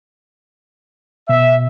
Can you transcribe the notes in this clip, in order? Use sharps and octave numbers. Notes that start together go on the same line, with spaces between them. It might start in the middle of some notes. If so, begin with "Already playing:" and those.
B2 E5